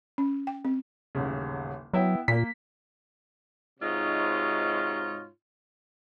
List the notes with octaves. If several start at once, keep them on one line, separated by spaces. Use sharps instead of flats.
C#4
G5
C4
D#1 A1 C#3
F#3 B3 E4 G5
A#2 A#3 B6
G#2 C3 D#4 F4 F#4 C#5